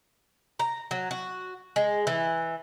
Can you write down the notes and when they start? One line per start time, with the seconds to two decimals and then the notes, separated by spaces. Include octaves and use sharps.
0.59 A#5
0.91 F#3
1.11 F#4
1.76 G#3
2.07 E3